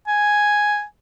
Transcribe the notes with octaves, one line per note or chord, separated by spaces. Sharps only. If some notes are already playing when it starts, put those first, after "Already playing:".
G#5